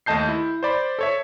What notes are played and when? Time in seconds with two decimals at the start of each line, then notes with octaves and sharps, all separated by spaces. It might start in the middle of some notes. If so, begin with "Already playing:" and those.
0.06 D#2 A3 D#5 A5 G6 C7
0.29 E4
0.63 C5 D5 B5
0.99 A4 C#5 E5